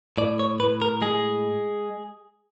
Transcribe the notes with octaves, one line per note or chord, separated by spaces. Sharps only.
A2 D5
C#5
A2 B4
A#4
G#3 G#4